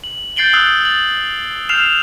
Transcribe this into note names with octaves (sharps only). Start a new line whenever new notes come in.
F#7
G6 A6 C7 D7 F#7 G7
D#6 E6 F#6 C7
A6 F#7
F6 G6 C7 E7 F7